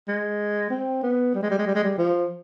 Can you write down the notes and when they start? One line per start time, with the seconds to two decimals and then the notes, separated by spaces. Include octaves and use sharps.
0.08 G#3
0.70 C4
1.03 B3
1.35 G3
1.43 G#3
1.50 G3
1.59 G#3
1.67 G3
1.75 G#3
1.84 G3
1.98 F3